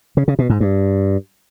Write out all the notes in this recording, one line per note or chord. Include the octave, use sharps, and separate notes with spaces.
C#3
C#3
B2
G#2
G2